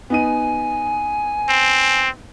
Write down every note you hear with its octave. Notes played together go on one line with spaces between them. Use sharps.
B3 D#4 G#5 D#7
C4